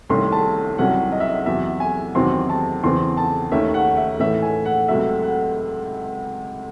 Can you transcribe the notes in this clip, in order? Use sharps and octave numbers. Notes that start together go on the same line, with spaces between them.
C2 C3 D#3 A3 C#4 C6
A5
C2 C3 F#3 C#4 F#5
D#5
E5
D#5
E2 C3 F#3 E5
G#5
E2 C3 D#3 F#3 C4 C6
A5
E2 C#3 E3 C4 C6
A5
D#2 D#3 A3 C#4 E5
F#5
E5
A2 E3 A3 C#4 E5
G#5
F#5
C#2 C3 F#3 A3 E5
F#5